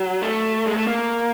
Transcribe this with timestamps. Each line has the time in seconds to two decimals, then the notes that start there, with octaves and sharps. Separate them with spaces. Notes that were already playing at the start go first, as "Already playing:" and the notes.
Already playing: F#3
0.22 A3
0.67 G#3
0.77 A3
0.87 A#3